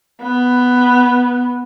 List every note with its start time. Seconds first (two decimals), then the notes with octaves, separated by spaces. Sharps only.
0.22 B3